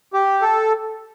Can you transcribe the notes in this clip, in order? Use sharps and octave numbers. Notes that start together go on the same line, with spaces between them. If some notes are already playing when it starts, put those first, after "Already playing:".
G4
A4